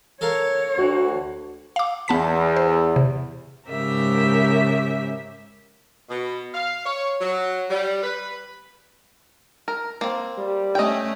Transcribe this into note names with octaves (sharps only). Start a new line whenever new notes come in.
A4 A#4 C#5 F5
D2 F#4
F5 D6
E2 B3 A5 B6
C5
C3
G#2 C#3 G4 A#4 E5
B2
F5
C#5
F#3
G3
B4
A#4
A#3 C4
G3
A3 C#4 D#5 G5